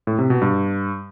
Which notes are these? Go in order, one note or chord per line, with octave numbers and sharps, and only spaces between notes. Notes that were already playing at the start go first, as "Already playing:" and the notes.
A2
C3
B2
G2